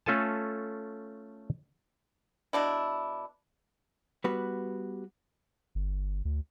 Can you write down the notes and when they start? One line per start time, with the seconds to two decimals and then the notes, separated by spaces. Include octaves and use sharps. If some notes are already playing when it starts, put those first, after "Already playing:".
0.06 A3 C#4 F4 A4 G#5 A5
2.53 B2 D4 E4
4.24 G3 B3 F#4 B4
5.75 G1
6.25 D2